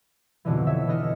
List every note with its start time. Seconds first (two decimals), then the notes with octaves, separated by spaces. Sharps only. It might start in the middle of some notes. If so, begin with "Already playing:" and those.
0.45 F2 B2 D3 E3
0.67 C#5 E5
0.87 D3 E3 D4 D#5 F6 C#7